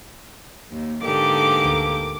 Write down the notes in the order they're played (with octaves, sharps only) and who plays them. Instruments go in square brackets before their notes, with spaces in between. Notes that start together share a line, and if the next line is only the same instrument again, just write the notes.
[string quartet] D#2
[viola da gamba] G#2 D3 G4 [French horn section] A#3 B3 A4 [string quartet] D6
[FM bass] D2